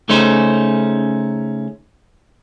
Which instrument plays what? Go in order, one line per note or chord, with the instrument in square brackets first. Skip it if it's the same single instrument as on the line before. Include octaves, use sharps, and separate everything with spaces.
[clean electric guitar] C#3 A3 C#4 D#4 C5